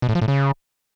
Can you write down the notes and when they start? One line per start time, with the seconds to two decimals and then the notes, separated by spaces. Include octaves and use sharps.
0.02 B2
0.09 A2
0.15 F3
0.22 A2
0.28 C#3